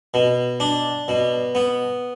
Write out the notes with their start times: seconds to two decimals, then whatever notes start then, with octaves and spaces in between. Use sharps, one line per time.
0.14 B2
0.60 D4
1.08 B2
1.55 B3